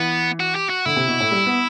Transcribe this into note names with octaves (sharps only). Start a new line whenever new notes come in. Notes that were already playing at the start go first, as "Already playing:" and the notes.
Already playing: E3 B3
F#4
G4
F#4
D3 E4
C3
B2
A2
G3
B3